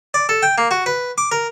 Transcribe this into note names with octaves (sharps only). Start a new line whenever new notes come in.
D5
A4
G5
A#3
F#4
B4
D6
A#4